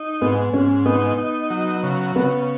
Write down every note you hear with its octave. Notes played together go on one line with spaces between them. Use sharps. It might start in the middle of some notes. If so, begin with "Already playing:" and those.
Already playing: D#4
G#2 B3
G#2 C#4
B3 D#4
D#4
F#3
C#3
C#3 B3